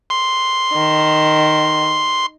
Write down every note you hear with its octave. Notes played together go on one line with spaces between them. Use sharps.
C6
D#3